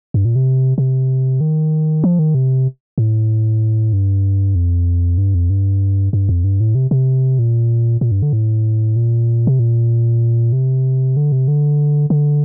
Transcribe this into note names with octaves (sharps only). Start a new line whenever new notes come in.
G2
A#2
C3
C3
D#3
F3
D#3
C3
A2
G2
F2
G2
F2
G2
G2
F2
G2
A2
C3
C3
A#2
A#2
G2
D3
A2
A#2
C3
A#2
C3
D3
C3
D3
D3